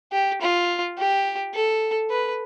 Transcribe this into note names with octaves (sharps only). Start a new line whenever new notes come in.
G4
F4
G4
A4
B4